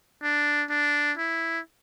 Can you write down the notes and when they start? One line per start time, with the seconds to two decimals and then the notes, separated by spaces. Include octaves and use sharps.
0.23 D4
0.70 D4
1.17 E4